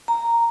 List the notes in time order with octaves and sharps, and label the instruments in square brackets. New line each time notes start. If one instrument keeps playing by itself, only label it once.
[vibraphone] A#5